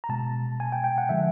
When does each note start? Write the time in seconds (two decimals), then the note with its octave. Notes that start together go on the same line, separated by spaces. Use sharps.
0.04 A#5
0.09 B2 G#3 A5
0.60 G#5
0.72 G5
0.84 G5
0.98 F#5
1.09 D3 F3 G#3 E5